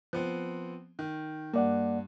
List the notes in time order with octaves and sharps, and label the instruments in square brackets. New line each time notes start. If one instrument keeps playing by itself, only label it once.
[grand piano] F3 B3 C4
D#3
[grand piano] G2 [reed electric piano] A#3 D5 F#5